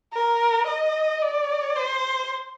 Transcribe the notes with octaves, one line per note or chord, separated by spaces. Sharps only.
A#4
D#5
D5
C5